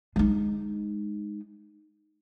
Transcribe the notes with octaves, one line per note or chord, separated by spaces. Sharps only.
G#3 D#4